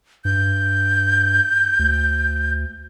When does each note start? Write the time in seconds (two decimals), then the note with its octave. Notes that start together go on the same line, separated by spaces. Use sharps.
0.25 G2 G6
1.79 D2